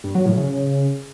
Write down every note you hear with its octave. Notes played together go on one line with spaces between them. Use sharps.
G2
F#3
A2
C#3